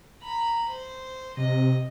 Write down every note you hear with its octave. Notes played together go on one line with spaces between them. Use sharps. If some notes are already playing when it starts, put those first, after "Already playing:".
A#5 B5
C5
C3 D#5